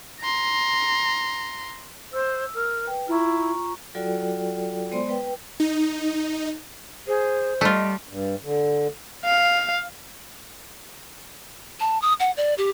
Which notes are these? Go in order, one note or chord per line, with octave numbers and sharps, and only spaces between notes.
A#5 C6
C5 E6
A#4
B4 G5
E4 F4 A#5 C#6
F#3 F4 F#4 A4 D5 G5
G#3 B3 C5 D5 C6
B4 G5
D#4
G#4 C5
G3 A3 F4 D#5
G2
D3
F5
A5
D#6
F#5
D5
G4